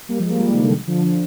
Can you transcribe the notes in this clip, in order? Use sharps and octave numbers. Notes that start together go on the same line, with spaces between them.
G3 A#3
F3 G#3
G3 A#3
G3 A#3
C3 D#3
D3
D3 F3